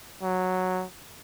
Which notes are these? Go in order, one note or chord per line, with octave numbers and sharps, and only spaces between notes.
F#3